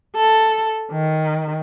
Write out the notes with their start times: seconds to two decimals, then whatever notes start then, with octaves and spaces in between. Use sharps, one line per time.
0.16 A4
0.91 D#3